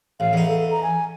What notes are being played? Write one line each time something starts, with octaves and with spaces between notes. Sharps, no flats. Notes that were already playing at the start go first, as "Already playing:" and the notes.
A1 F5
E2 D#4
A4
A#5
G#5